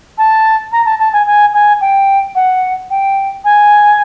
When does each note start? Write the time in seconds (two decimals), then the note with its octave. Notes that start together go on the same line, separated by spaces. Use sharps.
0.18 A5
0.72 A#5
0.86 A5
1.00 A5
1.13 G#5
1.27 G#5
1.54 G#5
1.81 G5
2.35 F#5
2.90 G5
3.45 G#5